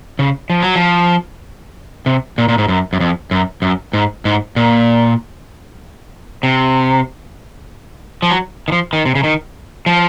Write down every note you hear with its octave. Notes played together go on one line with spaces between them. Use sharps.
C#3
F3
F#3
F3
C3
A#2
A#2
G#2
F#2
F#2
F2
F#2
F#2
G#2
G#2
A#2
C3
F3
F#3
D#3
F3
D#3
C3
C#3
D#3
F3